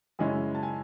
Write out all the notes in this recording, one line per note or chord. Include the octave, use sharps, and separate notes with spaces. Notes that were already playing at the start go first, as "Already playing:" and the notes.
F#2 C#3 G#3 C#4 E4 G#5
A5
G#5